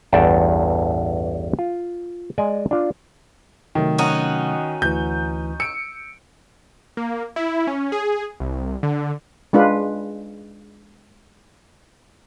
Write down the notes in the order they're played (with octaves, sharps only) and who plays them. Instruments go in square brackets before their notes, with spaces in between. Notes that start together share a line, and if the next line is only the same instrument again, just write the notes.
[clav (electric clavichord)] A1 E2 G2 G5 A5
F4
G#3 D5 D#5 G#5
D4 F4
[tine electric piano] C3 F#3 A3 [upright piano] D#3
[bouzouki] C#4 D#4 F#4
[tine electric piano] D2 E3 [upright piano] G6
[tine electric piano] E6 [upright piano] C#7 D7
[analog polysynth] A#3
E4
C#4
G#4
C2
D3
[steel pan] G#3 D4 F4 B4